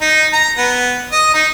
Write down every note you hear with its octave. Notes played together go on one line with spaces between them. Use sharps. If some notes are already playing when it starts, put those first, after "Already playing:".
D#4
A#5
B3
D#5
D#4